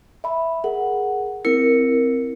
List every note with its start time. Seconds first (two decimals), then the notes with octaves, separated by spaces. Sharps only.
0.24 E5 B5
0.64 G#4 A#4 F#5
1.45 C4 E4 A#4 C#7